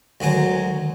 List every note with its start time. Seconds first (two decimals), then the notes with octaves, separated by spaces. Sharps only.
0.20 D2 D#3 F#3 G#3